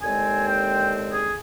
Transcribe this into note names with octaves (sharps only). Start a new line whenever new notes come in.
D#2 D3 G#3 C4 G#5
G5
G#4